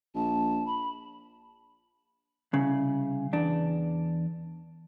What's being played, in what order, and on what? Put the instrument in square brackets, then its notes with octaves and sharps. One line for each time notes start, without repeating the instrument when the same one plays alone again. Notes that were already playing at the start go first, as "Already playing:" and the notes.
[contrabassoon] A#1 [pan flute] A5
[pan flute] B5
[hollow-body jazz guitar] C2 C#3
E2 D4